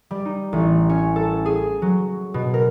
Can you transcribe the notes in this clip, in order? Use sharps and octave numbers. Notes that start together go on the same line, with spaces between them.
G3
D#4
A1
C#4
A4
G#4
F#3
B2
A#4